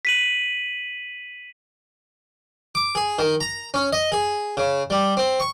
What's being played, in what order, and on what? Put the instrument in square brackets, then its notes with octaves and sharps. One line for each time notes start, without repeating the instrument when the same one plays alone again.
[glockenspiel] B6 D#7 F#7
[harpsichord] D6
G#4
D#3
A#5
C#4
D#5
G#4
C#3
G3
C4
C#6